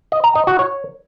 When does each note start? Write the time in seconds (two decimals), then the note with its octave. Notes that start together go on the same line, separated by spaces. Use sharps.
0.12 D#5
0.24 A#5
0.35 D#5
0.47 F#4
0.59 C#5